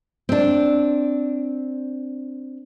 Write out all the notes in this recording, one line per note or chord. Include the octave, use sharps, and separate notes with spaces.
C4 D4